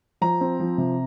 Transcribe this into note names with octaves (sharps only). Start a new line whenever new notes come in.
F3 A#5
C4
F3
C3